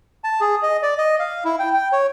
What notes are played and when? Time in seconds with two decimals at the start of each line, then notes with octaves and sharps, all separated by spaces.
0.24 A5
0.41 G#4
0.63 D#5
0.83 D5
0.98 D#5
1.19 F5
1.45 E4
1.59 G5
1.74 G5
1.92 C#5